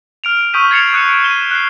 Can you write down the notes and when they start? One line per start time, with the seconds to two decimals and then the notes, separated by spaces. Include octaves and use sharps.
0.24 F6 D7 F7
0.54 C#6 D#6 E6 G6 B6 D#7
0.71 G#6 A6 C7 C#7 E7 F7
0.93 D#6 F#6 C#7 D7 E7
1.24 C7 D#7 E7 G7
1.51 F#6 C7